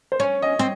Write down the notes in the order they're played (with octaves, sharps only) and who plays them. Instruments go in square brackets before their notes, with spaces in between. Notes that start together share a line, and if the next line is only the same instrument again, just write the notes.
[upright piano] C5
[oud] C#4 [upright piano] C#5
[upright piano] D#5
[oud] C4